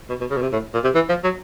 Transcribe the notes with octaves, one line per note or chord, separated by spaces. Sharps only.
B2
B2
C#3
B2
C3
A2
A#2
C3
E3
F3
F#3